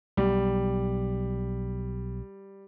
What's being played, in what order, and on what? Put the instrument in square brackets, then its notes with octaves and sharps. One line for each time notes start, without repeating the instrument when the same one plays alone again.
[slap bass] B1 [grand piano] G3